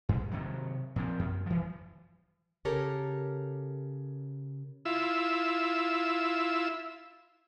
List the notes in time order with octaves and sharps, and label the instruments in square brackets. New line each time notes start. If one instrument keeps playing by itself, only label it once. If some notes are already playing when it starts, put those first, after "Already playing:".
[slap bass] G2
C3 D#3 F#3
A#2 F3 C4
F#2
E3 F3
[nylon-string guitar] C#3 G4 A4 A#4 C#5
[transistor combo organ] E4 F4 E6